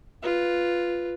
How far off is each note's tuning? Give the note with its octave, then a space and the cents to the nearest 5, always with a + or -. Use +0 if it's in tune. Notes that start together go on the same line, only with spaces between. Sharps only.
F4 +0 B4 +0